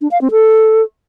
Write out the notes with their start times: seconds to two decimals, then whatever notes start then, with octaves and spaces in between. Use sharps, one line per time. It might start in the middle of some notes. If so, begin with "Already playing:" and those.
0.01 D4
0.11 F5
0.21 C4
0.31 A4